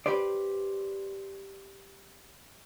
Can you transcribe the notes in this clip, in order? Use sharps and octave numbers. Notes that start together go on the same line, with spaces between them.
G4 B4 C5 D5